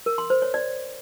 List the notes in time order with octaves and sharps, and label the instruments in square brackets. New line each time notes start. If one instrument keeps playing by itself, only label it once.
[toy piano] A#4
C6
C5
C#5
D5